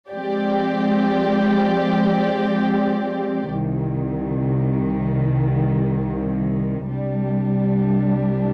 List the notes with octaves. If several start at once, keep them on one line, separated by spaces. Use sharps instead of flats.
F3 G#3 C4 G4 D5
C2 C3 D#3
C2 C3 G3 D4